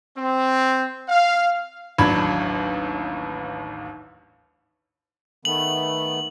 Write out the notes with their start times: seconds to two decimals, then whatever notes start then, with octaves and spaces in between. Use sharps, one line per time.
0.17 C4
1.09 F5
1.98 A1 D#2 F#3 D4 B5 G#6
5.45 D#3 A3 B3 F#7